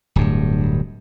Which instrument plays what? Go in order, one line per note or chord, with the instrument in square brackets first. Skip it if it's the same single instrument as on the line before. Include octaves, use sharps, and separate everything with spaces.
[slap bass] D1 G2